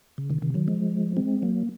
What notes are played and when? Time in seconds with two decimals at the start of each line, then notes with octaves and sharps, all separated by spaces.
0.18 C#3
0.30 C3 D#3
0.42 C3 D#3
0.54 D#3 F#3
0.68 F3 G#3
1.17 G#3 C4
1.42 F#3 A#3